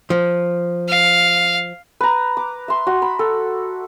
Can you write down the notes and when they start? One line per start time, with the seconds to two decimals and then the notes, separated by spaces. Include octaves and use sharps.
0.10 F3
0.89 F5
2.01 B4 A#5
2.37 D6
2.68 E5 C6
2.87 F#4
3.02 B5
3.19 A4